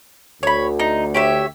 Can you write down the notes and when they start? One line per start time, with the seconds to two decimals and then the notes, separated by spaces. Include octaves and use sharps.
0.43 D2 C#5 B5
0.79 D#4
1.14 G4 C#5 E5